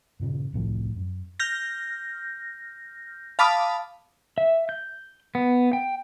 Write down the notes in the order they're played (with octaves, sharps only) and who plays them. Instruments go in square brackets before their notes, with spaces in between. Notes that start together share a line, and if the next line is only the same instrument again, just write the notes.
[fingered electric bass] G2 A#2 C#3
D#1 C2 A2 F3
F#2
[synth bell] F6 G6 A#6
F5 A5 B5 D6 D#6 F6
[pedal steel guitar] E5
G6
B3
G5